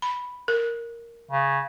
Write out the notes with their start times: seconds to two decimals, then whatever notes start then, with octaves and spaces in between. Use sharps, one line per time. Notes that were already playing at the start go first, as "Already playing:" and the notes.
0.02 B5
0.48 A#4
1.31 C#3